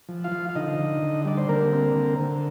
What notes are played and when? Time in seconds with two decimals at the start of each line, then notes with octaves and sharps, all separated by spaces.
0.09 F3
0.24 F4 F5
0.32 F3
0.49 F5
0.55 D3 D#4 D#5
0.79 D3
1.02 D3
1.25 G3 D5
1.37 C5
1.49 D3 A#3 A#4
1.73 C4
1.95 D3
2.19 D3